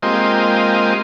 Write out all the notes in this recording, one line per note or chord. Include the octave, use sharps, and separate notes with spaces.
G#3 A#3 C4 F4 G4 D#5